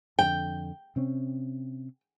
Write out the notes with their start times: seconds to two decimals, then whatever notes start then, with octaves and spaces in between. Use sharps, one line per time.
0.19 F2 D3 G5
0.96 C3 C4 C#4